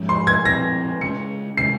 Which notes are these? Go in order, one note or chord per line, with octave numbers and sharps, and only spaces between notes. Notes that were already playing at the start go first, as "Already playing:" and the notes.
Already playing: G#2 F3 G#3 C#4
C6
G#6
A#2 F3 C4 A#6
C#3 G#3 C#4 C#7
C3 D#3 G#3 C#4 C7